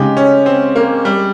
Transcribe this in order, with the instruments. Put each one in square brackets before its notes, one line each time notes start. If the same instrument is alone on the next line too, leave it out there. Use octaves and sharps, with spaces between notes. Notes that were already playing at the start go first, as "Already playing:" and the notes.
Already playing: [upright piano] C#3 G#3 D#4 [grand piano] G4
[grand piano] C#4
C4
A#3
G3